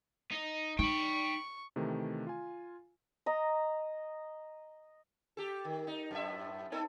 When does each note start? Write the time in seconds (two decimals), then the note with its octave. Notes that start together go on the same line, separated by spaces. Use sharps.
0.32 D#4
0.79 D#4 G5 B5 C#6
1.76 C3 D#3 E3 A3
2.27 F4 G#5
3.26 D#5 A#5
5.37 G4 A4
5.65 D#3
5.87 D#4
6.11 F#2 A2 E5
6.72 B3 D#4 A4